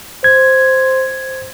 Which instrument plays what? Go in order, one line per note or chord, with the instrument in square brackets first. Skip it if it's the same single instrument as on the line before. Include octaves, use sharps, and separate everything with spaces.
[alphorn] C5 [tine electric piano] G#6